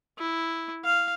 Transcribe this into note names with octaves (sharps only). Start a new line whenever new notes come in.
E4
F5